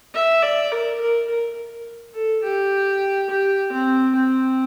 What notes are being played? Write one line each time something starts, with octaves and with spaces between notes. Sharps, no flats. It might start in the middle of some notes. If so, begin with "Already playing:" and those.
E5
D5
A#4
A#4
A#4
A4
G4
G4
C4
C4